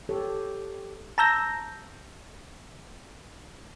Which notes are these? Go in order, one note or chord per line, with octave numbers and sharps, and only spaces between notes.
G4 A4 C#5
A5 A#5 E6 G6 A#6